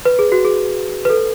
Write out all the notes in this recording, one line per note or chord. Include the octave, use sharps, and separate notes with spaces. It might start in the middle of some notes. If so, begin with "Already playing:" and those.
B4
G#4
F#4
G#4
B4
A4